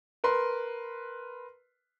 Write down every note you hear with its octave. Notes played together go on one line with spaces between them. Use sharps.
A#4 B4 C6